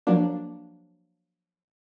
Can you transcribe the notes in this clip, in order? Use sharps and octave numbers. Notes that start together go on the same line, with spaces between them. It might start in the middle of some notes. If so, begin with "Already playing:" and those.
F3 F#3 A#3 D4